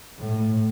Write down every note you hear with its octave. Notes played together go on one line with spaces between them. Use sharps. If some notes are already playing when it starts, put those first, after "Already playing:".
A2